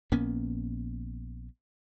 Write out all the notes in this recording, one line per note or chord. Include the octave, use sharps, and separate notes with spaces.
A#1 A#3 B3 C#4